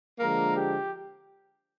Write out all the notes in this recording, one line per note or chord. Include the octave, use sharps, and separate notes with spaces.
D3 F3 G#3 A#3 A#4
G4